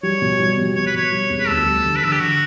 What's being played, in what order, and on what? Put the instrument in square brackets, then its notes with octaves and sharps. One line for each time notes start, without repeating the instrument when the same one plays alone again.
[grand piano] G3 [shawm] C#5
[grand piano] B2
G3
B2
[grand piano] B2 [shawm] C#5
[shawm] B4
[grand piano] B2 [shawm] C#5
[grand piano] G3
E2
[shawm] B4
[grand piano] D2 [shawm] A4
[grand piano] G3
D3
[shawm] B4
[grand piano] D3 [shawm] A4
[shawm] G4
[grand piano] D3 [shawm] F#4